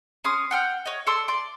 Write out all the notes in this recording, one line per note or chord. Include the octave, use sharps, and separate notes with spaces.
C#4 C6 D#6
F#5 G5 F6
C#5 D#5
A4 D5 C6 E6
D5 C6 D6